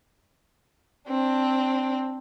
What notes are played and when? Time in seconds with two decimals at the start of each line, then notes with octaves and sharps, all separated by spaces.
1.07 C4 D4